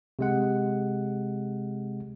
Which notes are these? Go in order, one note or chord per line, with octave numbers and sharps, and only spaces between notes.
C3 G#3 F#5